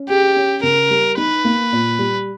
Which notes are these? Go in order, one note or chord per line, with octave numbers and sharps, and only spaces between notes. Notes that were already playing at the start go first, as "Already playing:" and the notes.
Already playing: C#4
G4 G#4
C#4
C#3 A#4
G3
D#4 B4
A#3
A#2
G3